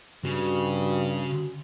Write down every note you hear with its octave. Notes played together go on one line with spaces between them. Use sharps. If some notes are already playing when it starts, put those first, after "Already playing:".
G2 C#3 F#4